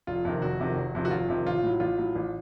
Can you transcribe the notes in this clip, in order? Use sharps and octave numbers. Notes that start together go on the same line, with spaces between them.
F1 F4
F2 C3 D#3
F1 F#4
F2 C3 D#3
F1
F2 C3 D#3
F#4
F1 F4
F2 C3 D#3
A1 F4
A2 F#3
A1 F4
A2 F#3
A1